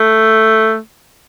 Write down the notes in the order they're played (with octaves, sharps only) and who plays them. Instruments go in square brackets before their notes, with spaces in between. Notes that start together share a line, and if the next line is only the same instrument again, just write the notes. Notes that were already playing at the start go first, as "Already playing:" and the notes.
Already playing: [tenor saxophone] A3